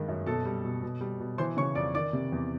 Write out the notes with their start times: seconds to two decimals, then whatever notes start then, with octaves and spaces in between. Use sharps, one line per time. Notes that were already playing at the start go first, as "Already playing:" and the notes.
Already playing: G2 D#3 G#3
0.08 F#2
0.26 B2 A4 A5
0.45 G3
0.65 B2
0.83 B2
1.01 G3
1.20 B2
1.38 E3 C5 C6
1.57 C#3 C#5 C#6
1.75 F2 D5 D6
1.94 D#3 D5 D6
2.13 C3
2.32 E2